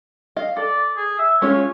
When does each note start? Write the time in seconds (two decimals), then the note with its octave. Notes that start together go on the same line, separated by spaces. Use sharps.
0.36 D#5 F5
0.57 A4 D5
0.97 G#4
1.18 E5
1.42 G#3 C#4 F4 C#5